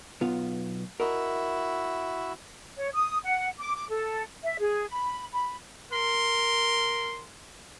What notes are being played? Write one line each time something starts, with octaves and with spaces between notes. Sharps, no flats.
B1 B3 F4
E4 F#4 A#4 D#5 E5
C#5
D#6
F#5
D6
D6
A4
E5
G#4
B5
B5
A#4 C6